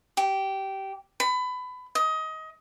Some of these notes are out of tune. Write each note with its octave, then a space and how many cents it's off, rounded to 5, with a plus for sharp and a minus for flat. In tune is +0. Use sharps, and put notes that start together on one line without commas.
G4 -15
B5 +25
D#5 +20